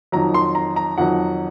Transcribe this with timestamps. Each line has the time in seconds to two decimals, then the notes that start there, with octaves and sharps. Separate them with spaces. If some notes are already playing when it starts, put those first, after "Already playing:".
0.12 F2 D#3 F#3 A#5
0.34 C6
0.55 A#5
0.76 A#5
0.98 F2 D#3 F#3 F#5